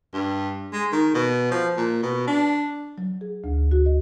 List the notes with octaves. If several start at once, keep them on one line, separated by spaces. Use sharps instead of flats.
G2
G#3
D#3
B2
F3
A#2
B2
D4
F#3
G#4
D2
F#4
D#5